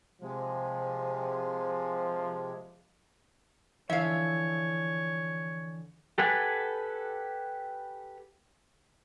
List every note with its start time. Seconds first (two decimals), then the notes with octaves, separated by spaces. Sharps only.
0.22 C3 F3 G#3
3.90 D3 E3 F3 C#5 E5 F5
6.18 G4 A4 B4 F#5 G#5